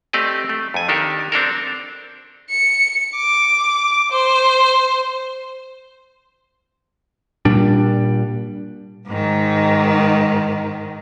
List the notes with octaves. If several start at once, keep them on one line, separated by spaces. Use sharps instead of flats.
A3 C4 G4 D5 D#5
A3
F2 G#5
D#3 D4 G4 A4 A#4
C4 D4 A4 A#4
C#7
D6
C5
A#2 G3 D4
G#2 D#3